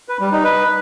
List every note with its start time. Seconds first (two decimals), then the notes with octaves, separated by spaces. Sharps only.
0.09 B4
0.20 G3
0.32 D#4
0.44 B4